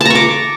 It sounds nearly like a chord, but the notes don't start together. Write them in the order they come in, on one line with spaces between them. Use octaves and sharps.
A5 A#5 C#6 D6